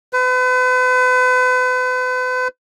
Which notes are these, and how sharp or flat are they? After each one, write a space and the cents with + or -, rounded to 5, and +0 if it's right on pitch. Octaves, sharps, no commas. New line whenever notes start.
B4 +40